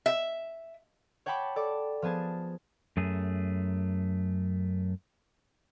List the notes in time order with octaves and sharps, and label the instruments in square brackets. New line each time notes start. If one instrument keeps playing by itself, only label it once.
[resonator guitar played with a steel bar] E5
[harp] C#5 F#5 G5 A5 B5 D6
A4 D5 A5 D6
F3 B3 G#4 A5 G#6
[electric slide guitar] F#2 A3 G#4